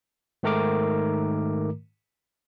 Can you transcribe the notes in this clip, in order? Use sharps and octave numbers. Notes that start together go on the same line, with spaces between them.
G#2 D#3 A3 A#4 A#5 D6